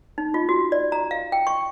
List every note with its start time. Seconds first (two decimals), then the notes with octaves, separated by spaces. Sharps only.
0.18 D#4
0.34 F4
0.49 F#4
0.72 D5
0.92 A#5
1.11 F5
1.32 G5
1.47 C#6